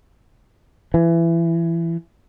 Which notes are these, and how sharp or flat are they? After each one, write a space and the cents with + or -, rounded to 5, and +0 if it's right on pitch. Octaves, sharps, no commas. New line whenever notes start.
E3 +20